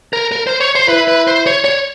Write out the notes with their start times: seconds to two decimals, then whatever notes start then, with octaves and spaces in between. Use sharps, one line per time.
0.13 A#4
0.32 A#4
0.47 C5
0.61 C#5
0.75 C5
0.88 E4 B4
1.08 B4
1.27 C5
1.47 C#5
1.64 C#5